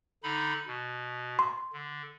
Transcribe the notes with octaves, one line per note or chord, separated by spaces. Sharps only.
D3 D#4 B5
B2
C6
D3